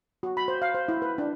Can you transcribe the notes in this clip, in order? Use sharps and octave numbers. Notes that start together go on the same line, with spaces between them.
F#4
B5
C5
F5
C5
E4
B4
D4